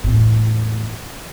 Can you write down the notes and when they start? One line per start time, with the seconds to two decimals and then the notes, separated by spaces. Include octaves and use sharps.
0.03 E2 A2